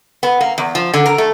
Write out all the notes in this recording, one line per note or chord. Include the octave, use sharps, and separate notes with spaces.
B3
A#3
E2
F3
D3
A#4
A3